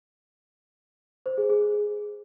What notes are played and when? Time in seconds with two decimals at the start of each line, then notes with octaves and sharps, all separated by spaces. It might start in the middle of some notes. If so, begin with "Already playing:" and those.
1.26 C5
1.38 G#4
1.50 G#4